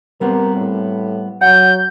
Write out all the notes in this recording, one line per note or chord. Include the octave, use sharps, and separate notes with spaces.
G3 B3 C4 A#4
A2
F#3 F#5 G6